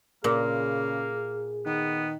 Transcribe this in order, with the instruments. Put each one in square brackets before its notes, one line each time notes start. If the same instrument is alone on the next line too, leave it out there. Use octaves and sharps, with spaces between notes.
[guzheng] A#2 [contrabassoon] C#3 [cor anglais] A#3 [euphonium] G#4
[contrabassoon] D#3 [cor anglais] B3